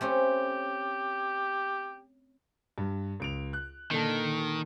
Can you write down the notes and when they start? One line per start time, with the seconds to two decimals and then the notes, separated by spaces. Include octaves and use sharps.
0.01 A3 C4 C#4 G4
2.78 G2
3.20 C#2 D7 F7
3.53 F#6
3.91 A#2 D3 D#3 A5